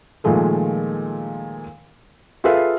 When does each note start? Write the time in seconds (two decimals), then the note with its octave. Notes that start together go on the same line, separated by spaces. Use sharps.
0.24 A#2 D#3 F3 G#3 A3
2.44 F4 G#4 A4 B4 E5 F5